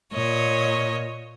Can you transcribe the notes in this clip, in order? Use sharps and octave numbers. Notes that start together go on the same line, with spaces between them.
A#2 C#5 D#5